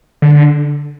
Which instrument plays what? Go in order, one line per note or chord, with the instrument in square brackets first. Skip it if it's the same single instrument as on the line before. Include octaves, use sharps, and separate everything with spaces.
[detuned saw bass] D3